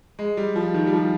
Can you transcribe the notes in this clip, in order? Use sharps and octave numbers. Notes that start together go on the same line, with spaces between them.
G#3
G3
F3
D#3
G3
F3